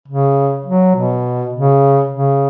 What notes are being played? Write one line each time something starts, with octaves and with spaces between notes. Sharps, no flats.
C#3
F#3
B2
C#3
C#3